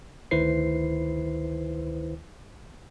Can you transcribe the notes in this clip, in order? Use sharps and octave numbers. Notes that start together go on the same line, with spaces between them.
D2 D#3 E4 B4 C5 C7